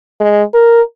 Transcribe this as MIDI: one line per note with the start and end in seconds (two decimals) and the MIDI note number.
0.20 0.42 56
0.54 0.81 70